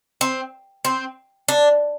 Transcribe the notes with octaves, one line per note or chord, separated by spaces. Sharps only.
C4
C4
D4